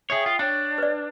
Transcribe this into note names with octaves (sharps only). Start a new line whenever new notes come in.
G#4 C#5 E5 G5 D#6
F4
D4 C#5 G5
B4 D5